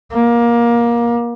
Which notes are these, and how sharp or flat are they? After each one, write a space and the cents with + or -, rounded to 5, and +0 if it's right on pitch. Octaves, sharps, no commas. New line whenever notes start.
A#3 +20